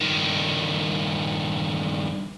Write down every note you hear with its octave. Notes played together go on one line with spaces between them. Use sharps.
G2 D#3